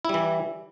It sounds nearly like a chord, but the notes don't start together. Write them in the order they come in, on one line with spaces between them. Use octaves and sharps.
E4 G3 E3